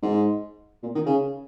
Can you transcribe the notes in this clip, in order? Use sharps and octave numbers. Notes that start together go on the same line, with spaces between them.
G#2
A#2
D#3
C#3